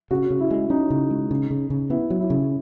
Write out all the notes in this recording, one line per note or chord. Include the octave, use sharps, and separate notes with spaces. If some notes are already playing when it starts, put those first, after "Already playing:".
C#3 F#4
C#3
E4
G#3
C#4 D#4
C#3
G#3
C#3
C#3
C#3
B3 E4
F#3
E4
C#3